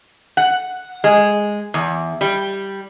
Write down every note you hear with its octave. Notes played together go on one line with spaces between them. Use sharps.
F#5
G#3
E2
G3